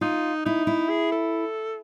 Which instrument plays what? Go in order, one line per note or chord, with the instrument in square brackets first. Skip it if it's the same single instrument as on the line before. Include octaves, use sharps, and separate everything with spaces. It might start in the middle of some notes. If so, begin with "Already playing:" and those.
[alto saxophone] D#4 [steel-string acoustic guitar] F4
[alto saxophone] D#4 [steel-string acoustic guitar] E4
[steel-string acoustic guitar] E4
[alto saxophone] G#4
A4